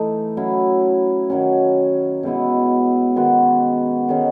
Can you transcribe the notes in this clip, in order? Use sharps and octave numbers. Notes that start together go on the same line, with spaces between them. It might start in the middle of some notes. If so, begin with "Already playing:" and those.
Already playing: E3 A3 D#4
F#3 C#4 E4
D#3 F#3 C#4
B2 G#3 B3 E4
D#3 G#3 B3 F#4
D#3 G#3 C#4